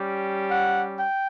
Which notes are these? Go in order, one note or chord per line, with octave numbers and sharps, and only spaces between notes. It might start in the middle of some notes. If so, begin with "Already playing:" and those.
Already playing: G3 C#4 G4
F#5
G5